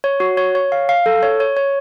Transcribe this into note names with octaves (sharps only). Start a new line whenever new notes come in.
C#5
F#4
C#5
C#5
F5
F5
A4
C#5
C#5
C#5